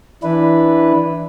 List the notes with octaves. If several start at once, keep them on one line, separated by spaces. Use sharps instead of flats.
E3 D4 E4 B4